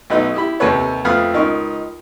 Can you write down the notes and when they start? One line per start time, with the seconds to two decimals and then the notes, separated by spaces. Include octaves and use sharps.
0.10 B1 A3 D#4 B4 D#5
0.34 E4 G4 B5
0.60 D#2 C3 A4 B4 C#5
1.05 F2 A3 B4 F5 D#6 F6
1.34 C#2 D#4 A#4 C#6